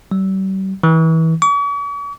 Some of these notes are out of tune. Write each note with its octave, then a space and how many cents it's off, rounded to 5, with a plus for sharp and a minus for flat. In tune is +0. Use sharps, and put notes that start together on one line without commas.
G3 -40
E3 -30
C#6 +45